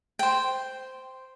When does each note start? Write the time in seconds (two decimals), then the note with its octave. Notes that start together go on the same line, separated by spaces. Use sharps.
0.19 C5 G5